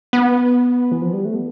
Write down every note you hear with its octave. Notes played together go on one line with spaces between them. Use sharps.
B3
E3
F3
G3
A3
B3